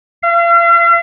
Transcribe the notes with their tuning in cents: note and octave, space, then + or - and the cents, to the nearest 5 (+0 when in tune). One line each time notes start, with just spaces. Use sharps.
F5 -40